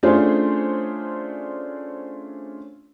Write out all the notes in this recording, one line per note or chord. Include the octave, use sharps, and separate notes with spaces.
A3 C#4 D4 F4 G#4 C5